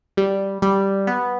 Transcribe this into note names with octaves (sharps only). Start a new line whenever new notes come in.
G3
G3
B3